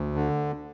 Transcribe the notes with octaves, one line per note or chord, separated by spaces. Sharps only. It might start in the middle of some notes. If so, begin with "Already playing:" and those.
Already playing: D2
D3